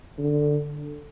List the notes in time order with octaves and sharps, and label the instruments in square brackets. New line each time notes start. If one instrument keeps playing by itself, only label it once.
[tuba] D3